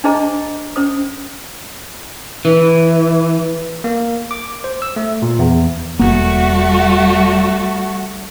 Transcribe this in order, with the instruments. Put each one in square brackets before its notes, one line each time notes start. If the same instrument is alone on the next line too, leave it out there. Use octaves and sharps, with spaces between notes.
[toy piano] D4 D#4 G#4 C5 D#5 A#5
C#4 C5 D#6
[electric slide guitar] E3
[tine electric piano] A#3
D6
C5
E6
A3
A#2
E2
[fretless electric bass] E1 D#2 A#3 [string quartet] G3 A3 F#4